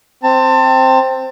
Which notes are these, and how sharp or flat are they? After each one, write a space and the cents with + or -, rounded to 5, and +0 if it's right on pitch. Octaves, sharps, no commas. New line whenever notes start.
C4 +0 A5 +30